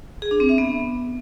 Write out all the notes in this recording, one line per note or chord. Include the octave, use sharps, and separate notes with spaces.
G#4
D4
C4
E5
B3